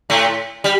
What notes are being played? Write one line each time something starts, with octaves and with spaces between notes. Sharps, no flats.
A2 A3
G3